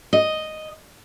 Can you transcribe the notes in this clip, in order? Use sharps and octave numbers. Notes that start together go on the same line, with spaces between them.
D#5